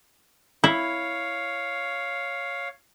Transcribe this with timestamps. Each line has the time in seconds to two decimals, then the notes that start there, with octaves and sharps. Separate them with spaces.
0.64 E4 C#5 F5